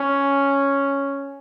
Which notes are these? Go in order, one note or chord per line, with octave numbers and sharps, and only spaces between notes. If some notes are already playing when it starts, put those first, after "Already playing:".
Already playing: C#4